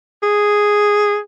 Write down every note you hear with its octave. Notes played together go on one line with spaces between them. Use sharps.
G#4